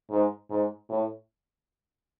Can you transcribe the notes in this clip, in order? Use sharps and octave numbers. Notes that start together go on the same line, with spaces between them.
G#2
G#2
A2